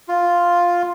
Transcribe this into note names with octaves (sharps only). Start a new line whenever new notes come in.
F4